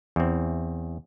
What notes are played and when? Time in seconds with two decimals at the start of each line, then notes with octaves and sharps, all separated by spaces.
0.16 E2 C4